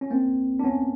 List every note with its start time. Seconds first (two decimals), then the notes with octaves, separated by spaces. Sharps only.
0.01 C#4
0.10 A#3 C4
0.59 D4
0.63 B3 C#4